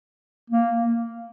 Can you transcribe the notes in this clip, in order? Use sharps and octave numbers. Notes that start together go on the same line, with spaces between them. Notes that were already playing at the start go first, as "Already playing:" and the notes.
A#3